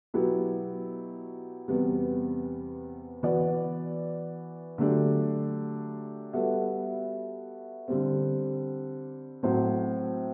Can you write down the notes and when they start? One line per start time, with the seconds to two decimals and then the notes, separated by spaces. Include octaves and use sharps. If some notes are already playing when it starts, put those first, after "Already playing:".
0.14 B2 F#3 B3 E4 G4
1.68 E2 C3 G3 B3
3.23 E3 B3 F#4 B4 D5
4.78 D3 F#3 A3 D4 G4
6.33 G3 B3 F#4 A4 E5
7.88 D3 G3 C4
9.43 A2 F#3 C4 F#4 C5